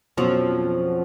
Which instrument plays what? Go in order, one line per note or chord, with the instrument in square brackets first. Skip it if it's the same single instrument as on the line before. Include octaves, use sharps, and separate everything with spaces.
[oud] F2 F3 [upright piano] B2 F#3 C#4 F#4